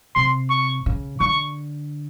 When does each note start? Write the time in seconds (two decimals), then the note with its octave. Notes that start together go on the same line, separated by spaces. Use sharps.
0.15 C3 C6
0.50 C#6
0.86 C#3
1.20 D3 C#6